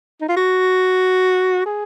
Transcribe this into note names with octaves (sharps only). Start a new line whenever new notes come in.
D#4
F4
F#4
G#4